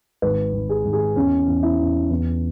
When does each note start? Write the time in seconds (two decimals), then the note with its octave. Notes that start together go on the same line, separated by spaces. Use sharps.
0.22 G#1 B4
0.53 G#1
0.69 G#4
0.85 G#1
0.93 G#4
1.16 E2 C#4
1.47 E2
1.63 E4
1.79 E2
2.10 E2